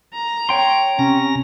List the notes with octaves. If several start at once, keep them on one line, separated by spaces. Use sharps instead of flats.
A#5
C#5 G5 C6
C3 C#4 A#5 A#6